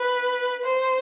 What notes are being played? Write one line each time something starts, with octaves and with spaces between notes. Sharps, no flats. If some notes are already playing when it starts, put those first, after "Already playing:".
Already playing: B4
C5